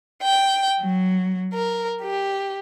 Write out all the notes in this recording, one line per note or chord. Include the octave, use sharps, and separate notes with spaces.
G5
F#3
A#4
G4